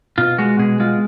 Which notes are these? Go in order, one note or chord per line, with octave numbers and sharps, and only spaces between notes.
B2 F4
G#3 F#4
B2 G#4
G#3 F4